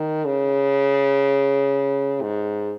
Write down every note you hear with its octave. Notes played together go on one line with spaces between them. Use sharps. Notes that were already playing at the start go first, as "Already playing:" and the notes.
Already playing: D#3
C#3
G#2